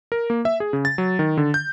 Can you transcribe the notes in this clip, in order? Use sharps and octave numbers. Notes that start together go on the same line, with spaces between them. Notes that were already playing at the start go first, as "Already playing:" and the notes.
A#4
A#3
E5
G#4
C#3
A6
F#3
D#3
D3
G6